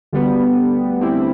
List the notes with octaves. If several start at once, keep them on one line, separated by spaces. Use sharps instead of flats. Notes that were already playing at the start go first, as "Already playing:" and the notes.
D2 D3 G3 B3
D2 D3 G3 C4 E4